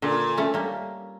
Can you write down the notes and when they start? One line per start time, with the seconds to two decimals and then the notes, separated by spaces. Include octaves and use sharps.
0.02 A#2 D3
0.37 A3 C#4
0.54 G3 A#3